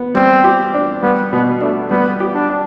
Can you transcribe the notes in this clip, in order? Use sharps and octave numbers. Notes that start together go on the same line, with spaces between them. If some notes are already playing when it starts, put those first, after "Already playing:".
Already playing: B3
G3 C4
G4
D4
G3 B3
B2 B3
A3 D4
G3 B3
G4
D4
D4